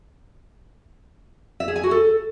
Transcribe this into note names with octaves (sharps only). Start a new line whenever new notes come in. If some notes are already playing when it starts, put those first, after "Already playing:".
E5
G#4
G#5
F#4
A4